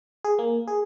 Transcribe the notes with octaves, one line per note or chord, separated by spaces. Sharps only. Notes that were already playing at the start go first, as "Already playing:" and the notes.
G#4
A#3
G#4